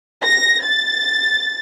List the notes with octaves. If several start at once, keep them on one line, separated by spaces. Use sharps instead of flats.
A#6
A6